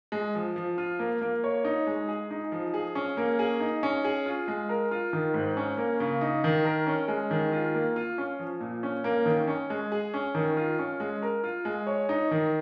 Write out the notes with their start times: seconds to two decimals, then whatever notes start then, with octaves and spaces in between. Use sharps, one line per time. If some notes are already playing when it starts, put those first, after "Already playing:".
0.12 G#3
0.35 F3
0.56 F3
0.78 F4
0.99 A#3
1.21 A#3
1.44 C#5
1.65 D#4
1.87 G#3
2.08 G#4
2.31 D#4
2.52 F3
2.74 G#4
2.95 C#4
3.17 A#3
3.39 G#4
3.60 D#4
3.83 C#4
4.04 G#4
4.26 F4
4.48 G#3
4.69 A#4
4.91 F4
5.13 D#3
5.34 G#2
5.57 C#4
5.78 A#3
6.00 C#3
6.21 D#4
6.44 D#3
6.65 A#4
6.87 C#4
7.08 G#3
7.31 D#3
7.52 F4
7.75 A#3
7.96 F4
8.18 C#4
8.39 F3
8.61 A#2
8.83 C#4
9.04 A#3
9.26 D#3
9.47 C#4
9.70 G#3
9.92 G#4
10.14 C#4
10.35 D#3
10.57 F4
10.79 C#4
11.00 G#3
11.22 A#4
11.44 F4
11.65 G#3
11.87 C#5
12.09 D#4
12.31 D#3